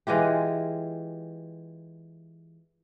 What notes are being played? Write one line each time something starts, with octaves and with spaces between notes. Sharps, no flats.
E3 G#3 F4 G4